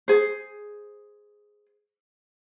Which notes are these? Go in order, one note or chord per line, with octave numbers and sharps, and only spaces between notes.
G#4 C5